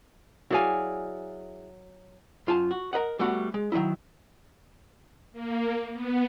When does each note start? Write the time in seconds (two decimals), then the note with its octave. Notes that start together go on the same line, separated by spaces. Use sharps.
0.50 F#3 E4 G#4 D5 F5 G#5
2.47 F#2 F4 G#5 A5
2.71 F#4
2.93 A#4 B4 D#5 F#5
3.19 G3 A3 B3 F#4
3.54 G#3
3.72 D#3 F#3 G#3 D#4 E4
5.33 A#3
5.93 B3